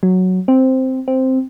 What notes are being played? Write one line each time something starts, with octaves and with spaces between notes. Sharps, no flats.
F#3
C4
C4